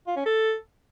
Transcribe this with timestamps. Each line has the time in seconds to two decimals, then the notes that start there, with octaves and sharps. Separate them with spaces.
0.07 F4
0.16 C#4
0.26 A4